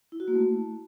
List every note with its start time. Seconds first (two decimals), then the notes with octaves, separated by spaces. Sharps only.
0.12 E4
0.20 F#4
0.28 A#3
0.35 A3